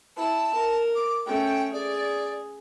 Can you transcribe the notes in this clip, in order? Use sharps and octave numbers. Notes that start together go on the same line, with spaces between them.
E4 A5
A#4
D6
A3 C#4 G5
G#4 D5